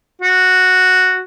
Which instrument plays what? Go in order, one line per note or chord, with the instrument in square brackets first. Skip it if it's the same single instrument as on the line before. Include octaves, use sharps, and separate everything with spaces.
[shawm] F#4